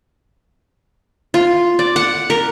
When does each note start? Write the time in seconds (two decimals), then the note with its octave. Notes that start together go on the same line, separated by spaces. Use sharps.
1.34 F4
1.79 D5
1.96 F#5
2.30 A#4